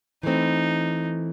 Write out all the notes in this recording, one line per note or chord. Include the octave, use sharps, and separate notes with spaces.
E3 A3 C4 D#4